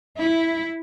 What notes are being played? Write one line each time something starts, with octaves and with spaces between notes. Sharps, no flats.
E4